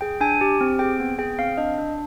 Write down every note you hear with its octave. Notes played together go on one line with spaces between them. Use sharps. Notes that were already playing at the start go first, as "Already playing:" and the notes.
G#4 G5
D4 G#5
G4
C4
G#4 G5
B3
G#4 G5
C4 F5
D4 D#5
D4